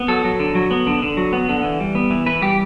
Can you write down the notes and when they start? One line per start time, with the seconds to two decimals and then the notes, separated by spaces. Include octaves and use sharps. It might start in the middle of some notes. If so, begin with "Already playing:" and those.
Already playing: B3
0.08 F#3 A4
0.25 F#3
0.40 D3
0.55 F#3
0.71 B3
0.87 D3
1.02 D3
1.17 F#3
1.33 B3
1.49 D3
1.64 E3
1.80 G3
1.95 B3
2.10 E3
2.26 E3 B4
2.41 G3 G4